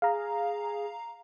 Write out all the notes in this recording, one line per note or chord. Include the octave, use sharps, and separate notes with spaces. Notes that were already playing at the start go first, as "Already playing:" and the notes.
G#4 F5 A#5